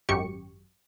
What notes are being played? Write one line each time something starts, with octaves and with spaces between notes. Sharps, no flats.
G#1 F#2 G4 C#6 C#7